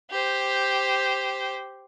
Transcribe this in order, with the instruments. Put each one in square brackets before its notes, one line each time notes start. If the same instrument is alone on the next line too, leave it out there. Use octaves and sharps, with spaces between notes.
[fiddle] G4 C5